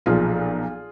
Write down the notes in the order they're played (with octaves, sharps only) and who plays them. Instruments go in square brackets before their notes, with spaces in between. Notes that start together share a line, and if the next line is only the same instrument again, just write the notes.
[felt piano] B1 A#2 F3 F4 G#4